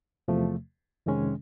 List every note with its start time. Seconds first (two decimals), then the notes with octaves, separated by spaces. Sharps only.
0.28 E2 C3 F3 A3
1.06 F2 C3 D#3 G#3 C#4